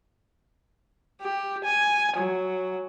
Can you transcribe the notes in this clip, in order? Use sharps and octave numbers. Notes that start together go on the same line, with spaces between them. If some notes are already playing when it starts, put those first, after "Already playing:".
G4
G#5
F#3